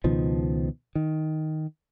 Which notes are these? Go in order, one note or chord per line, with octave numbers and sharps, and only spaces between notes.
C#2 B2 D#3 F3
D#3